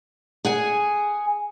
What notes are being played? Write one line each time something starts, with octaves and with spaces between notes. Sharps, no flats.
G#4 F#5 G#5